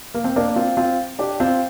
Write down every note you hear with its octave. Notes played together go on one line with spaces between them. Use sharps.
A#3
C4
A#3 D4
C4 F4
C4 F4
D4 G4
C4 F4